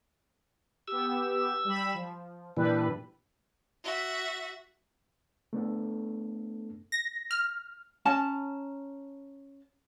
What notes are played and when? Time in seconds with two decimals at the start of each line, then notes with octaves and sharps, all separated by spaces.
0.88 B3 G4 E6
1.65 G3 B5
1.94 F3
2.57 A#2 E3 G3 D4 B4
3.84 F#4 E5
5.53 A3 B3 D4 A4
6.92 A#6
7.31 F6
8.05 C#4 A5 A#5